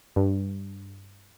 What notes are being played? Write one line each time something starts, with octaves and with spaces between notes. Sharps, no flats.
G2